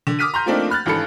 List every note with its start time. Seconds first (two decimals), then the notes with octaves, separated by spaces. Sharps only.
0.07 D3
0.19 D6 D#6 F6 B6 D#7
0.34 A#5 C6 G6
0.46 F3 A3 A#3 C4 D4 D#4
0.70 B5 F6 F#6 A6
0.86 G#1 G2 E3 A4 B5 C#7